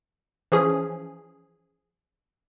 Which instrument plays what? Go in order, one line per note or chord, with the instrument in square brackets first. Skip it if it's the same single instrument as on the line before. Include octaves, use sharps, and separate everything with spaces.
[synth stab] E3 F3 C#4 G#4